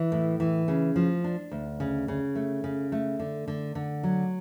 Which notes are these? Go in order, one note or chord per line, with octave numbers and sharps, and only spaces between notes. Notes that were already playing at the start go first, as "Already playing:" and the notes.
Already playing: E3
A2
E3
C#3
F3
D4
D2
C#3
C#3
A3
C#3
A3
D3
D3
D3
F#3